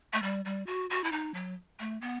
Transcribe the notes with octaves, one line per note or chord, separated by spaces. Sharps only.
A3
G3
G3
F#4
F#4
E4
D#4
F#3
A3
B3